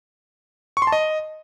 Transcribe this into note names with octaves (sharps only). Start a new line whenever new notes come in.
C#6
C6
A5
D#5